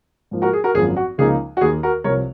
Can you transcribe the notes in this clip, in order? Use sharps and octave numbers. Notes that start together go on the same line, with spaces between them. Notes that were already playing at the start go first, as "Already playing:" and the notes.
G#2 F3 A#3
F#4 A#4
G#4
F#4 A#4
G#1 F#2 F3 A#3 G#4
F#4
C#2 C#3 F3 A#3 D#4 G#4
F#4
D#2 D#3 A#3 G#4
F#4 A#4
C2 C3 F3 A#4 C#5